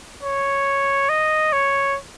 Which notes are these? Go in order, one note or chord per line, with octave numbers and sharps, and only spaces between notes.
C#5
D#5
C#5